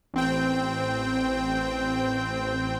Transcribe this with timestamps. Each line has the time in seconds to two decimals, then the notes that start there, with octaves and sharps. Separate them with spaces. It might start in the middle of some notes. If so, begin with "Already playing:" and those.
0.14 A1 C4 G5